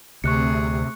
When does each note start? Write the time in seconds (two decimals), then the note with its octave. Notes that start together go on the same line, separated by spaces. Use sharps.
0.24 D2 C3 A3 G#4 C#6 F#6 C#7